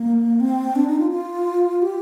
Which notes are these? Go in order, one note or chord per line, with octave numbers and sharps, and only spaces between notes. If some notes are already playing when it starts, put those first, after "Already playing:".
Already playing: A#3
C4
D4
D#4
F4
F4
G4